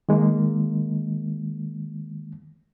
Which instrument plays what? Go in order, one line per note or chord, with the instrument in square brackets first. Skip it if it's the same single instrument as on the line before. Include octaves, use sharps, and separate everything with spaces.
[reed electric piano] D#3 G#3 A#3